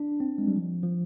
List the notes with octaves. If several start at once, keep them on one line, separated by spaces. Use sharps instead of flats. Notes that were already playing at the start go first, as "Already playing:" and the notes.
Already playing: D4
C4
G#3
G3
F3
F3